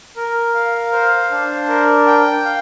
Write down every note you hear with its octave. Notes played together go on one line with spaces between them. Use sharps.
A#4
F5
C5
D4
A#4
G5
F5